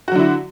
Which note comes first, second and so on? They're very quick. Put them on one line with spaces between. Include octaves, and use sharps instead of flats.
F#4 F#3 D3 E4